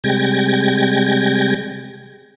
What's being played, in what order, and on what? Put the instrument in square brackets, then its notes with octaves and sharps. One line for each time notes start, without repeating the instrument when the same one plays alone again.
[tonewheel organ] C3 G3 G#3 G5 G#6 A#6